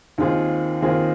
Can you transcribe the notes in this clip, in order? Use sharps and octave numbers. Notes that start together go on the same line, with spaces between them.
D#2 D#3 C4 F4 G#4
D#2 D#3 C4 F4 G#4